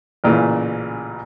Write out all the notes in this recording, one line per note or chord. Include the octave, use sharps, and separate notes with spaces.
A1 A#2 C#3 E3